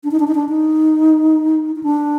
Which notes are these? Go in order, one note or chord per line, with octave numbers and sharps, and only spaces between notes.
D4
D#4
D4
D#4
D4
D#4
D#4
D4